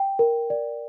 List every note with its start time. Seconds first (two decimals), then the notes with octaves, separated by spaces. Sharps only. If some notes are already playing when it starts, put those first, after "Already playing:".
Already playing: G5
0.19 A#4
0.50 D5